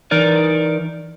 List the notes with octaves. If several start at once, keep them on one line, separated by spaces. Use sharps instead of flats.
E3 D#4 A#4 D5